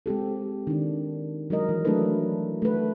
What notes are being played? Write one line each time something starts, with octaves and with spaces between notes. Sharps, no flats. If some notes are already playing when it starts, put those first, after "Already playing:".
G#3 C4 G4 A4
D#3 D4
F#3 G#3 A#4 D#5
E3
F#3 A3 D4 E4 A4 B4
A3 B4